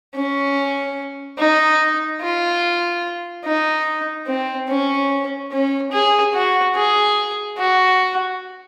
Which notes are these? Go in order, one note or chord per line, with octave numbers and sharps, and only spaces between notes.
C#4
D#4
F4
D#4
C4
C#4
C#4
G#4
F#4
G#4
F#4